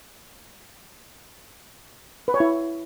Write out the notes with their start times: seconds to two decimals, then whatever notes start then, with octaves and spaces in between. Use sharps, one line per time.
2.28 B4
2.34 C#5
2.40 E4